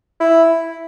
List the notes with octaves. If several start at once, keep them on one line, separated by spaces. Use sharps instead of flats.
E4